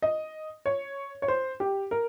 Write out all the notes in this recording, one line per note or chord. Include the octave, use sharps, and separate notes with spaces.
D#5
C#5
C#5
C5
G4
A#4